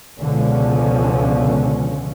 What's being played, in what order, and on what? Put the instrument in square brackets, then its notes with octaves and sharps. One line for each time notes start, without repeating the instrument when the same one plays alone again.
[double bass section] C#2 B2 D3 F3 C#4